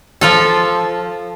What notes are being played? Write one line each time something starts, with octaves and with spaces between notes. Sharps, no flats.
F3 F4 A4